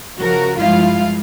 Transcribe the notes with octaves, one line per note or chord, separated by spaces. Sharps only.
C#3 F3 F#4 A#4
G2 F3 G#3 E4 F4 F5